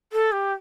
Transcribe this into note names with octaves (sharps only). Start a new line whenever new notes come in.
A4
G4